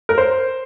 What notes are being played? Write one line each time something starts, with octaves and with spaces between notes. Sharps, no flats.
A#4
C5